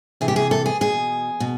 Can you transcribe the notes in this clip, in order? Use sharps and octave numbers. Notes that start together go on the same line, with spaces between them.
C3 E3 G#4
G4
G#4
A4
G#4
B2 G#4
B2